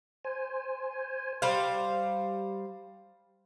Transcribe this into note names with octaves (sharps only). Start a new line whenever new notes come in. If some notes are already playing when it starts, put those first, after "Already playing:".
C5 G#5
G3 C5 F5